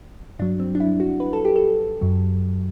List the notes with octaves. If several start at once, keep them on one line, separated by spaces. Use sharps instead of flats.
G2 F#3 D4
C4
D4
E4
F#4
B4
A4
G4
A4
F#2 F#3